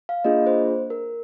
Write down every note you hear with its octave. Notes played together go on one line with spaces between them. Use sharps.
F5
A#3 D4 F4 G#4 D#5
C5
A#4